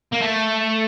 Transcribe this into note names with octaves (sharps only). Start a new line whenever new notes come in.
A#3
A3